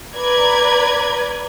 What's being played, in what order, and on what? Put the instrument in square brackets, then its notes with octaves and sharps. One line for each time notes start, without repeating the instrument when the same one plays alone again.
[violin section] B4 D5 A#5 G#6